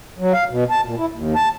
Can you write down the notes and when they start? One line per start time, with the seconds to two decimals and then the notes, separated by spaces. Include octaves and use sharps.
0.19 F#3
0.33 F5
0.50 B2
0.70 A5
0.84 A#2
0.98 E4
1.11 D#2
1.35 A5